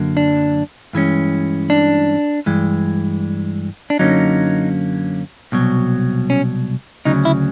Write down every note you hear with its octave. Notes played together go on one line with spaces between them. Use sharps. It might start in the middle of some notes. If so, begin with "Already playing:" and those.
Already playing: F#2 D3 F#3 A#3
D4
G2 E3 G#3 C#4
D4
G2 E3 G#3
D4
F#2 D3 F#3 A#3 C#4 D#4
C2 B2 F#3
C#4
D2 C#3 F#3 D#4
E4